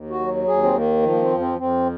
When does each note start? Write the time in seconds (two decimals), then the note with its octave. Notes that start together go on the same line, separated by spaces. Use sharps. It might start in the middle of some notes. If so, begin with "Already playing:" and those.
Already playing: D#2
0.10 F#4
0.19 F#3
0.47 D#2 G#4
0.63 C4
0.75 D#3 A#3
1.03 F3
1.11 A#3
1.21 C4
1.30 F2
1.40 C4
1.59 F2 C4